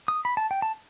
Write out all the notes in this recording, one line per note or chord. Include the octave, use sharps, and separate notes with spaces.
D#6
B5
A5
G5
A5